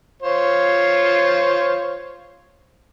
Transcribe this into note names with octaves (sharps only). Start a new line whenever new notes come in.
F4 C5 C#5